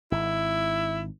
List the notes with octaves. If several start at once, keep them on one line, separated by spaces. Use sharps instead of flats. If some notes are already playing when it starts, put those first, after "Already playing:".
G#1 E4